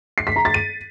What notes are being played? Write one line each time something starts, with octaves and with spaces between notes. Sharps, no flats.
C7
B6
A#5
A6
D#7